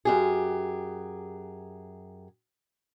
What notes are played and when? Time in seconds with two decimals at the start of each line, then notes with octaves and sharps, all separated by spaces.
0.05 F#2 G4 G#4